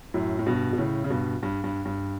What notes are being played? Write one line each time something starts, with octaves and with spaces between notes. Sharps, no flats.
F#2 A2
A2
G2 B2
B2
A2 C#3
C#3
G2 B2
G2
G2
G2